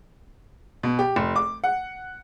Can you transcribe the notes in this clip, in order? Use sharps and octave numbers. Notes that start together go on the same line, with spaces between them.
B2
G4
F1
D6
F#5